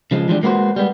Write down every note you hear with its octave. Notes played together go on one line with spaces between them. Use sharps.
C#3 F3 G#3
E3 F3 G3 G#3 B3 D4
G#3 A#3 B3 E4 F#4 C5
G3 G#3 B3